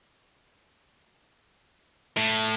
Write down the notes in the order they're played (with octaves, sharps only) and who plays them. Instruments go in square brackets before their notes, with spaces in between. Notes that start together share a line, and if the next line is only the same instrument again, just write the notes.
[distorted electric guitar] A2